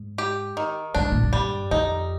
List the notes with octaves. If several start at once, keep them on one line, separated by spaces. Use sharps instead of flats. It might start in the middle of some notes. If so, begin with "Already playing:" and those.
Already playing: G#2
G4
D#3
G#2 D4
A#2
G#2
G2 G3
F2 D#4